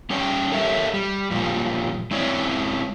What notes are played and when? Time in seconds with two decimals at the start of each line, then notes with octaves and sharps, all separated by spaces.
0.10 G3 C#4 C#5 D5 G5
0.52 G4 A4 A#4 C#5 E5
0.94 G3
1.31 F#2 A#2 F3 G3
2.11 G#3 C4 E4 C#5 D5